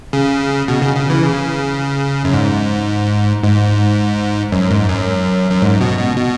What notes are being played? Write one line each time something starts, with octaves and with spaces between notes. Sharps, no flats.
C#3
B2
C#3
C#3
E3
C#3
F#2
G#2
G#2
F#2
G#2
F#2
F#2
G#2
B2
B2
B2